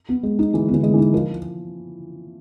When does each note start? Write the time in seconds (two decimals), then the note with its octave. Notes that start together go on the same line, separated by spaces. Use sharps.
0.09 B3
0.23 G#3
0.39 D#4
0.53 E3 G#3
0.68 B3
0.74 E3
0.83 G#3
0.94 E3
0.99 D#4
1.13 F3 A#4